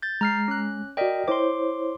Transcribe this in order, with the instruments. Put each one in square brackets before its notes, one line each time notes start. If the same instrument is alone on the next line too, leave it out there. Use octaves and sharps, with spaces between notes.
[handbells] G6 A6
[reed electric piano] G#3 [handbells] A#5 F6 C7
[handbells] C#4 F#6
[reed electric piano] F#4 D5 [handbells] A#4 D#5 G5
[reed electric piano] E4 C5 C#5 [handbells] C6 D6